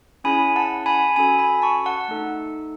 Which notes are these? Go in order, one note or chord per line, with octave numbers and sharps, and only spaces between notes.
C#4 E4 G#4 G#5 B5
F#5 A5
G#5 B5
C#4 F#4 A4 G#5 B5
G#5 B5
A5 C#6
F#5 A5
A3 D#4 A4